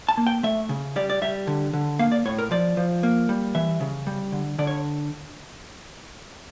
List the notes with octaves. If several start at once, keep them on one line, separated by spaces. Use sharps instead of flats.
A5
A#3
G5
A3 E5
C#3
G3 D5
D5
G3 E5
D3
D3
A#3 F5
D5
A2 C#5
A#4
F3 D5
F3
A#3
G3
E3 E5
C#3
G3
D3
D3 D5
C#5